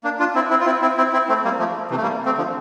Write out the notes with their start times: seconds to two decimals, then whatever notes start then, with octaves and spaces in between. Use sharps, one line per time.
0.04 A#3 D4
0.19 D4 F4
0.35 C4 E4
0.50 C4 E4
0.60 F4
0.66 C4 E4
0.82 C4 E4
0.97 C4 E4
1.13 C4 E4
1.28 A3 C4
1.44 G3 A#3
1.59 F3 A3
1.91 C3 E3
1.97 A3
2.02 G3 A#3
2.25 A3 C4
2.37 D3 F3